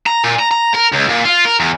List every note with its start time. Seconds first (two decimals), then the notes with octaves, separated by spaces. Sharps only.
0.06 A#5
0.24 A#2
0.39 A#5
0.51 A#5
0.74 A#4
0.92 C#2
1.09 A#2
1.25 F4
1.45 A#4
1.60 E2